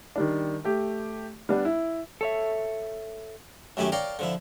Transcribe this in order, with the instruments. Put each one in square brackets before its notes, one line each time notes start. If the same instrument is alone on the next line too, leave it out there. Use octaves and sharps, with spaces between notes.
[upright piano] D#3 G3 D4
A3 G4
G3 B3 D4
E4
[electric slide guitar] A4 C#5 E5
[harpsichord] F#2 D#3 A3 E4 G4 G#5
A#4 C#5 D5 F5 G5
D3 F3 E4